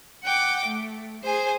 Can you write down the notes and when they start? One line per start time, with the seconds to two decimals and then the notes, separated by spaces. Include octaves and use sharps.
0.24 F#5 G5 D6
0.66 A3
1.24 G#4 C5 G#5